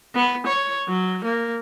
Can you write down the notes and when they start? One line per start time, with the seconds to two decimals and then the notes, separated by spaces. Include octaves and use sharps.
0.15 B3
0.47 C#5
0.88 F#3
1.24 A#3